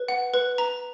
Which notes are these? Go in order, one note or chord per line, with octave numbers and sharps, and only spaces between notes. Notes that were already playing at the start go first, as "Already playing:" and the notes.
Already playing: B4
F#5
B4
A#5